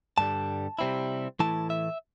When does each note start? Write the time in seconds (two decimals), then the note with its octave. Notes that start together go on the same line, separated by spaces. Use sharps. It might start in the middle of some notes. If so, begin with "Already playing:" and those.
0.18 G2 D3 G3 A5
0.79 C3 G3 C4 E4
1.40 A2 E3 A3 E4 A5
1.70 E5